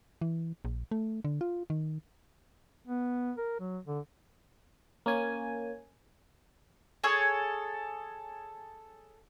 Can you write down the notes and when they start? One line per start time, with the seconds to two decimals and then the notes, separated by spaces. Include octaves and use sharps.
0.21 E3
0.65 A#1
0.91 A3
1.24 D3
1.41 F4
1.70 D#3
2.87 B3
3.38 A#4
3.60 F#3
3.87 D3
5.06 A#3 C#4 G#5
7.04 G#4 A4 C#5